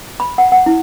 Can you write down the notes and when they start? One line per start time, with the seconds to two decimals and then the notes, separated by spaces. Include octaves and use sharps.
0.20 B5
0.38 F#5
0.52 F#5
0.66 E4